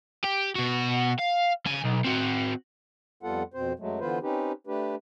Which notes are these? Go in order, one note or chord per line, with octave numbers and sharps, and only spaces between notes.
G4
B2 F#4
F5
C#3 G#5
B1
C4 F#4
F2 G3 B3 F4 A4 F#5
F2 B2 C4 C5
F#2 F#3 G#3 A3
D3 E3 B3 F4 B4 C5
C4 C#4 D#4 G4 B4
A3 D4 G4 B4